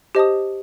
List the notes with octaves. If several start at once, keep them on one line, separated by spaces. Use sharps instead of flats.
G4 C5 D#5 A5 D#6